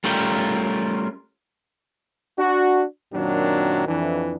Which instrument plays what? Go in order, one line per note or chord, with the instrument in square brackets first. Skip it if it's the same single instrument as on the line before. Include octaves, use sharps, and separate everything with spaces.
[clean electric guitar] G3 A3 C#4 F4 A#4 G5
[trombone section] D4 F#4
F#2 A#2 D#3 F#3 C4 D4
F2 E3 D4